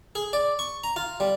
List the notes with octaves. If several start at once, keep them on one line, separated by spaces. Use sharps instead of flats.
G#4
D5
C#6
A#5
F4
G3